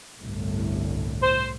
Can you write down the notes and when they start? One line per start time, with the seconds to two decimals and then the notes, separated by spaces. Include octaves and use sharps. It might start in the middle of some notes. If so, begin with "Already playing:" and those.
0.18 G1 C2 A2
1.23 C5